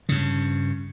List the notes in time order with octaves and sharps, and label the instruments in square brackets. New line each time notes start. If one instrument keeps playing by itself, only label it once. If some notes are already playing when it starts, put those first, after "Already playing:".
[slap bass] G2 C#3